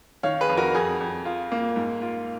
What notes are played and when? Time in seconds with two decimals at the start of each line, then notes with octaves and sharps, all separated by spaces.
0.23 D#3 C#5 F5
0.40 G#4 B4
0.49 F2
0.57 F#4 A#4
0.75 F2 G#4
1.01 F2
1.25 F4
1.52 A#3
1.76 G#2
2.02 F4